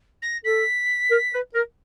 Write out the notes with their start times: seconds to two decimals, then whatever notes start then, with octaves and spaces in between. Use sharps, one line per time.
0.22 A#6
0.44 A4 B6
1.10 A#4
1.33 B4
1.54 A#4